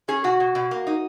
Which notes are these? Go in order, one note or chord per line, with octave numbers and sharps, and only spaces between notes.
C#4 G#4
B2 F#4
B2
B2
A#3
D#4